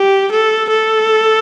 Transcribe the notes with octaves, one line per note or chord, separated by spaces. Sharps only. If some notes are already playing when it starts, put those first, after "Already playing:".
Already playing: G4
A4
A4